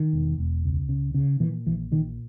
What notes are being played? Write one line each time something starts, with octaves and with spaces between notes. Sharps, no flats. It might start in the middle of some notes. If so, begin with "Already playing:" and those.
Already playing: D#3
E1
E1
C#2
C#3
C#3
A#2 E3
A#1 E3
A#2 D#3